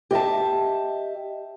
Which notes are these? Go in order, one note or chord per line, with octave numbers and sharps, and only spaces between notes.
G4 D#5 E5 A5